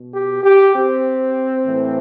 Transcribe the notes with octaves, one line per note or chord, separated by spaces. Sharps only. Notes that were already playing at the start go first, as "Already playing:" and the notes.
Already playing: B2
G4
G4
C4
A2 E3